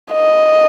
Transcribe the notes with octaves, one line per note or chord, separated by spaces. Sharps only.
D#5